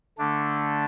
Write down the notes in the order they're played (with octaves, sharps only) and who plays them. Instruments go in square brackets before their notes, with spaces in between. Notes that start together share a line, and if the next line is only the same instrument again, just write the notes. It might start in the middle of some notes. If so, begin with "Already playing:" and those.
[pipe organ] D3 A3 D4